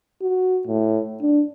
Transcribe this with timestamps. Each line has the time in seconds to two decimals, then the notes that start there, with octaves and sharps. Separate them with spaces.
0.22 F#4
0.67 A2
1.22 D4